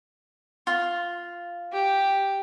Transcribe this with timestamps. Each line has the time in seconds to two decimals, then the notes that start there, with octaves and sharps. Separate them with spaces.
0.67 F4
1.73 G4